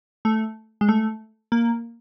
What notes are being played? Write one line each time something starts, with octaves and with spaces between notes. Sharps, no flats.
A3
G#3
A3
A#3